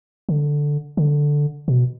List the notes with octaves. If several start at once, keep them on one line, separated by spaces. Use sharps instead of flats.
D3
D3
B2